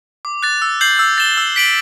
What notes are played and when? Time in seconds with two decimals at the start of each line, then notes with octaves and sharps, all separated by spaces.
0.25 D6
0.43 F#6 A6
0.62 E6
0.81 G6 C7 F#7
0.99 E6
1.18 A6 E7 G7
1.37 E6
1.56 B6 D7 F#7